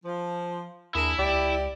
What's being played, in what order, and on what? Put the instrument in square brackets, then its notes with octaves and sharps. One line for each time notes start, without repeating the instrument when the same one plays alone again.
[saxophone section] F3
[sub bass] D#2 [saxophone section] D4 G#4 A#4 [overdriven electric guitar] E4 E5
[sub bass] C#2 [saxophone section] G4 D5